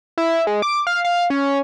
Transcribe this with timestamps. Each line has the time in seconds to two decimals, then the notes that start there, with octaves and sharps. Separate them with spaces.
0.18 E4
0.47 G#3
0.62 D6
0.87 F5
1.05 F5
1.30 C#4